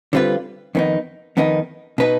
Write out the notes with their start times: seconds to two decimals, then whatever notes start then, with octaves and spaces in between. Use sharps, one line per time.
0.13 D3 G3 C4 F4 B4
0.75 F2 D#3 B3 D#4
1.37 F2 D#3 B3 D#4
1.98 B2 B3 D#4 B4